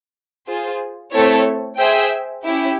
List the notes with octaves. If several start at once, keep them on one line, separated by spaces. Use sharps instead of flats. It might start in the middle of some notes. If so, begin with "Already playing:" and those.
F4 G#4 C5
A3 C4 E4 A4 C#5
G#4 C5 E5 G5
C#4 E4 G4